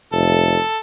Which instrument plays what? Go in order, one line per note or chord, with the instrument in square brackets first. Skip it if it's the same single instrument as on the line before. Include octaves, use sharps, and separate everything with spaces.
[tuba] F1 [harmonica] A4